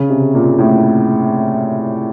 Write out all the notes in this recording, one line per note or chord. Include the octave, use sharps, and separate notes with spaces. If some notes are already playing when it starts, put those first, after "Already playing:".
Already playing: C#3
C3
A#2
A2